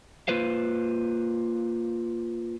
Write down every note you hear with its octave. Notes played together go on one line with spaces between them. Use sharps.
A#3 F4 B4 C5 F5